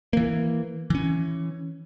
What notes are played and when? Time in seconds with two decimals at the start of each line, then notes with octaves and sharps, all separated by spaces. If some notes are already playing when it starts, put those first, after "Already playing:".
0.13 E3 A#3
0.90 E3 C#4